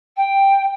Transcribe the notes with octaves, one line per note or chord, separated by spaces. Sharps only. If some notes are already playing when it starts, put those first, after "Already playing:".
G5